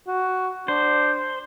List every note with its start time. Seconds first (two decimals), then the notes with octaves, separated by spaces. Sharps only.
0.07 F#4
0.68 D4 C5